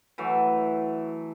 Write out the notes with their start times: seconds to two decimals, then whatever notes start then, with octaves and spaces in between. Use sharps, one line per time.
0.18 E3 F#3 A3